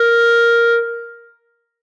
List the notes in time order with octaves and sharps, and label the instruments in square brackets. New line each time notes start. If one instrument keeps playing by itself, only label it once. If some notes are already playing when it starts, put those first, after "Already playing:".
Already playing: [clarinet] A#4